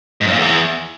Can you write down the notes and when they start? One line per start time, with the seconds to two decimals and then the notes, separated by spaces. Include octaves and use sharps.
0.21 G#2
0.27 F#2
0.33 A#2
0.39 E2